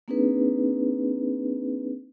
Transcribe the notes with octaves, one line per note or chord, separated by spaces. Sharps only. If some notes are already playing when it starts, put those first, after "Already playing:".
A#3 C4 D4 D#4 G#4 B4